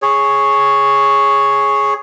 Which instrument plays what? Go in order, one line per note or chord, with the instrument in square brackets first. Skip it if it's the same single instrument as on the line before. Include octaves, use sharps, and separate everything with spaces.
[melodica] G#4 C#5